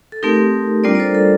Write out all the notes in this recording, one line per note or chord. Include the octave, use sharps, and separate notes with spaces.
A4
A3 C4 D#4 G4 A#4
G3 A#3 D4 F4 A#4 D5
D5
A4 C5
A4